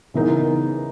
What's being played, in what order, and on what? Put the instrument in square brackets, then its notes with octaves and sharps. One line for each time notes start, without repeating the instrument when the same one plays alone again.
[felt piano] C#3 E3 B3 D#4 A#4